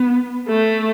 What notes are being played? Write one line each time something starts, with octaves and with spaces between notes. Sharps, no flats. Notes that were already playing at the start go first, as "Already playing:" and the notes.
Already playing: B3
A3